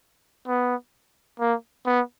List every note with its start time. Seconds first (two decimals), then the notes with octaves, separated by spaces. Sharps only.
0.47 B3
1.40 A#3
1.86 B3